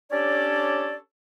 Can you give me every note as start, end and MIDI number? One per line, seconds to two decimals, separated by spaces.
0.12 0.96 61
0.12 0.96 62
0.12 0.96 67
0.12 0.96 69
0.12 0.96 73
0.12 0.96 74